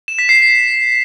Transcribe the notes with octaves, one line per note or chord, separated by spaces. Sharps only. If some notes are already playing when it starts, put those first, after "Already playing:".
E7
B6
C7